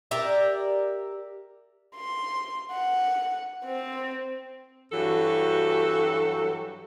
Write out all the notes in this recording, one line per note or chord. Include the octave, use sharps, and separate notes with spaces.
G4 A#4 D5 E5
C6
F#5
C4
G2 E3 F#3 F#4 G4 A4